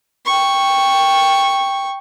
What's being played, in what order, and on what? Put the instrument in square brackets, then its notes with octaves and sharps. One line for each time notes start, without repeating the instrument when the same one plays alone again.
[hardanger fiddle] G5 C#6